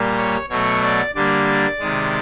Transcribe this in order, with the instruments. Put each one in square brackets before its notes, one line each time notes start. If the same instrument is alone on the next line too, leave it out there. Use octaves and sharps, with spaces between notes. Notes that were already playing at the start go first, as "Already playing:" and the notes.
Already playing: [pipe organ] A#2 G3 A#3
C#5
B2 F#3 A3 C#5
D5
D3 G3 A#3 D5
C3 D#3 G#3